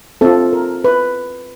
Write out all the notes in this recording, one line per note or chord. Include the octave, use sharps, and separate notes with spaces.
C4 F4 A4
A#4
B4